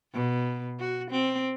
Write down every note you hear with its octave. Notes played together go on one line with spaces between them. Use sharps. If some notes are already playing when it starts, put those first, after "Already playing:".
B2
F#4
C4